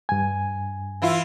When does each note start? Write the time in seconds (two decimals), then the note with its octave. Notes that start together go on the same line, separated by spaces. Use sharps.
0.09 G2 G#5
1.02 E3 E4 F4